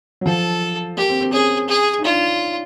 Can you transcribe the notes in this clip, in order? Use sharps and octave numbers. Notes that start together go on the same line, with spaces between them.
F#3
F3 A4
A#3 G4
C4
C4
C#4 G#4
G#4
D#4
D4 F4